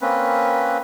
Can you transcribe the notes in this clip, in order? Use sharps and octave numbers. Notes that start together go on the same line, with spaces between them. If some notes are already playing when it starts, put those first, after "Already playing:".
A#3 C4 C#4 B4